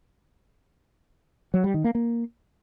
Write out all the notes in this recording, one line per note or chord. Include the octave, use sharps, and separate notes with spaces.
F#3
G3
D#3
A#3
A#3